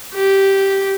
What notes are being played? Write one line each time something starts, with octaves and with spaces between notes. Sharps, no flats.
G4